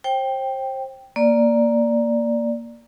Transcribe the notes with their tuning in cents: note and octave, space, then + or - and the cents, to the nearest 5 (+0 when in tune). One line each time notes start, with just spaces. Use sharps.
C5 +30 G5 +0
A#3 +0 D5 +0